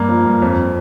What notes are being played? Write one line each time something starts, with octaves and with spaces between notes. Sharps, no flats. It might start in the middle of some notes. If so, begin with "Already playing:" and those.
Already playing: G2 A#3
F3
G2
F2